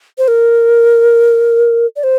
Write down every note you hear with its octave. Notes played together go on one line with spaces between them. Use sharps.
C5
A#4
D5
C5